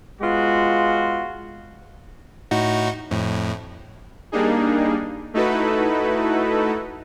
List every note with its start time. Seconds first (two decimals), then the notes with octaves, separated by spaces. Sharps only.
0.22 G#3 B3 F4 F#4
2.51 A2 D#4 F#4
3.11 F2 A2
4.32 G3 A#3 D4 D#4 G#4
5.34 A3 D#4 E4 F#4 A4 B4